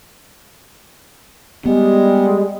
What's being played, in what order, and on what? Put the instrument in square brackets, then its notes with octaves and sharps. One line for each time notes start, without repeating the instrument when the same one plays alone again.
[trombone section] G3 G#3 [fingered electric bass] B3